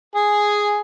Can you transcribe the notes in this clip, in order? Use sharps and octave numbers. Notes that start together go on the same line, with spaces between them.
G#4 G#5